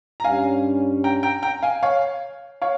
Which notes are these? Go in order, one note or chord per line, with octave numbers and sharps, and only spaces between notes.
A#5
G2 G3 C#4 F5 G#5
G5 A#5
G5 A#5
G5 A#5
F5 G#5
C#5 F5
C#5 F5